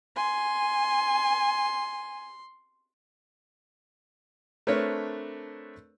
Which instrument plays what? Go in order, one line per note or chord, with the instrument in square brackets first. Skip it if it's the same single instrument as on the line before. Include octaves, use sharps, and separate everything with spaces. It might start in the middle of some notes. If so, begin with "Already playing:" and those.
[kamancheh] G#5 [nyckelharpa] C6
[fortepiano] A3 C4 D4 A#4 B4 C#5